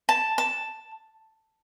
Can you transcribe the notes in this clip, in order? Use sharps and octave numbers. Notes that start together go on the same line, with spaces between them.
A5
A5